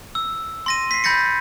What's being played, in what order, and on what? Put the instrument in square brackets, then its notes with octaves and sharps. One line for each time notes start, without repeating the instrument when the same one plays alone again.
[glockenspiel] E6
C6 A#6 D#7
B6 C7
B5 G6 A6 A#6 C#7